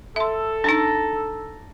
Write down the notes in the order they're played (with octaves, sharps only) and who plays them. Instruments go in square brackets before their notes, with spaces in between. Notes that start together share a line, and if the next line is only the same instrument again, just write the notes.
[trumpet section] A4 [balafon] E5 C6
[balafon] D4 D#4 [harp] A5 A#5 A#6